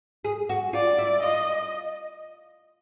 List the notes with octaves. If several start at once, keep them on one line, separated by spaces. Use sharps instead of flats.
G#4
F#4
F4 D5
E4
F4 D#5